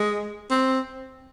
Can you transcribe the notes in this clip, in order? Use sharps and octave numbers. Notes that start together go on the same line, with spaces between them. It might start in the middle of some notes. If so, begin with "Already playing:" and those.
Already playing: G#3
C4